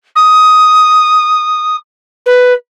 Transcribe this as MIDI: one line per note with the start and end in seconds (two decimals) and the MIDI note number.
0.16 1.76 87
2.26 2.53 71